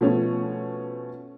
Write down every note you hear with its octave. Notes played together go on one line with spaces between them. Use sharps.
B2 F3 A3 C#4